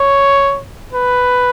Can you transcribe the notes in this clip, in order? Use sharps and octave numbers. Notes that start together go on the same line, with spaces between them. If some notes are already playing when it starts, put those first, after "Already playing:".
Already playing: C#5
B4